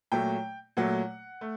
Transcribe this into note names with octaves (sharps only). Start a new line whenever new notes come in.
A#2 F#3 A3 G5
A#2 F#3 A3 F#5
A3